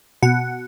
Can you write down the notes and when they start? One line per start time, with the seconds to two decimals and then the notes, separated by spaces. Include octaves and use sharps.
0.23 B2 F#5